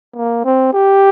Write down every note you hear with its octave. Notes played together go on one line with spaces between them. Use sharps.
A#3
C4
G4